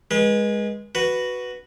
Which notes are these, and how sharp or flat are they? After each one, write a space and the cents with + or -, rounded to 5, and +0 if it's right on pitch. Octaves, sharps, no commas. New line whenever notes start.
G#3 -5 B4 -35
F#4 +0 B4 +0